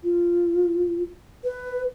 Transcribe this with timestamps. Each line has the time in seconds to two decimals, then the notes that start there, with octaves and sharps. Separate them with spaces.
0.04 F4
1.44 B4